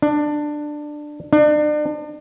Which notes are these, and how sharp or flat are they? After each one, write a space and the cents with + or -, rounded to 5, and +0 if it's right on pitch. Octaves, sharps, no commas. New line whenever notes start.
D4 +15
D4 +35